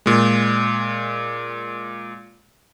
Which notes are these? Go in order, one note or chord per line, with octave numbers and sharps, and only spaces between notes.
A#2 G#3